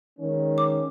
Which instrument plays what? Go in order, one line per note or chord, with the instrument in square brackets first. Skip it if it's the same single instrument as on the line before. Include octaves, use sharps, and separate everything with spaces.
[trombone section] D#3 G#3 C#4
[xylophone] D6